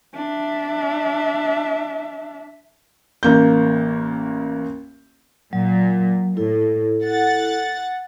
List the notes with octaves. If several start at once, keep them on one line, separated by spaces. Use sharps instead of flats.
D4 E5
A1 A#3 G6
A#2 F#3
A2 E4 A4
F#5 A6